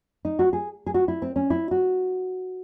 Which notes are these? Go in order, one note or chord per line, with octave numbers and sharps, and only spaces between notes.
D#4
F#4
G#4
G#4
F#4
E4
C4
C#4
E4
F#4